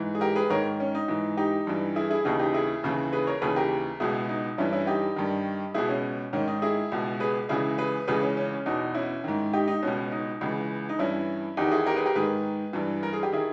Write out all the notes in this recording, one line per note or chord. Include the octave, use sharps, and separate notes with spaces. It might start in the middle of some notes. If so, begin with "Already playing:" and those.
Already playing: G#2 E3
G#4
G4 A#4
G#4 B4
G#2 D#3 A#4 C#5
C#4
D#4
G#2 E3
D#4 G4
G2 E3
E4 G#4
E4 G#4
D#2 C#3 E3 D#4 G4
D#4 G4
E4 G#4
D#2 C#3 E3
G#4 B4
A#4 C#5
D#2 C#3 E3 G#4 B4
G4 A#4
C#2 B2 E4 G#4
D#4
G2 E3 C#4 E4
C#4 E4
D#4 G4
G2 D#3
C#2 B2 E4 G#4
C#4
G#2 D#3 C#4
D#4
E4 G#4
C#2 B2
G#4 B4
C#2 C#3 E3 E4 G#4
G#4 B4
C#2 C#3 E3 G#4 B4
C#4
C#4
C#4
E2 B2 D#4
C#4 E4
G#2 D#3
D#4 G4
D#4
C#2 B2 C#4
D#4
C#2 C#3 E3
D#4
G2 E3 C#4 E4
E2 D#3 D#4 G4
E4 G#4
G4 A#4
G#4 B4
G4 A#4
G#2 D#3 G#4 B4
G2 E3
A#4
G#4
G4
D#3 E4 G#4